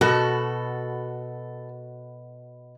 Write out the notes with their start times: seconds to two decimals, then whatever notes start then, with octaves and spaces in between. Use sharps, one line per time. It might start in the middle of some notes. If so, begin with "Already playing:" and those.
0.01 B2 F#4 A4